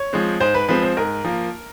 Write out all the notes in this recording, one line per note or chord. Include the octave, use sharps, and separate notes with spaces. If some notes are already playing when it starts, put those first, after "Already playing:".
Already playing: C#5
F3 G#3 C4
G#2 C5
B4
F3 G#3 C4 B4
C5
G#2 A#4
F3 A#3